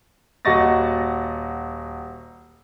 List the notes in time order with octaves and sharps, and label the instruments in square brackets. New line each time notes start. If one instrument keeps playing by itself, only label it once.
[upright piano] D#1 F#4 D#5 C#6 A6 A#6